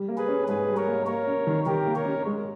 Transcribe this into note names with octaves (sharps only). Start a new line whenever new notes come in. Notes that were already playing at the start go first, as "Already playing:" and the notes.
Already playing: G3
A#3
G#4 B4
C#4
G#2 G#4 B4
G3
A#4 C#5
A#3
A#3 A#4 C#5
C#4
D#3
D#3 G4 A#4
A#3
A#4 C#5
C#4
G#3